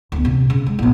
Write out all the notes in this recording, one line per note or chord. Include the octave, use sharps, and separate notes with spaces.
D2 B3
C3
C#3
G#3
A#1 B3